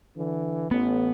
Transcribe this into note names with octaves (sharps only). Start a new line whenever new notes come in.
D3 E3
A1 B3